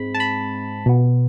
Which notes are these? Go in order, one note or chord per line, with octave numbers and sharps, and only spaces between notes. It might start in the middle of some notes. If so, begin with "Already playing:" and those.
Already playing: G#2 G#3 C4 B5
A5
B5
B2 B3